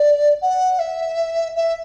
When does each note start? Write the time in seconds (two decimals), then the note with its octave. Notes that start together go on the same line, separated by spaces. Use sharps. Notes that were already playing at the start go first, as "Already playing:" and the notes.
Already playing: D5
0.41 F#5
0.79 E5
1.56 E5